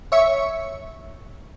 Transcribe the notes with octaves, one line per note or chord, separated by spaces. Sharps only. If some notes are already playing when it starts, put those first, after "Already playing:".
C#5 E5 C#6